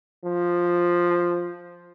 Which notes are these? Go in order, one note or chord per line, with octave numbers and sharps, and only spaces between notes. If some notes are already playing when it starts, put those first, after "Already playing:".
F3